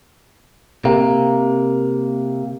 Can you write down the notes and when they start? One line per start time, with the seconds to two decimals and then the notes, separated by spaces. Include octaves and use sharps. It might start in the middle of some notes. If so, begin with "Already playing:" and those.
0.85 C3 A#3